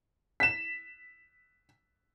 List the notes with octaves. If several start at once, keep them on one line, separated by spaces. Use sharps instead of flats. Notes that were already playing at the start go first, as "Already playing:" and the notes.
B6 E7